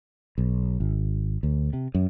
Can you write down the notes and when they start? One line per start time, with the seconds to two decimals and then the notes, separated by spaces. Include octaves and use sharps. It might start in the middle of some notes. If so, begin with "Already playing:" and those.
0.38 B1
0.80 G#1
1.43 D2
1.73 C3
1.95 F#2